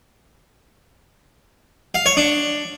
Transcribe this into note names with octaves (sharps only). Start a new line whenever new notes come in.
F5
C#5
D4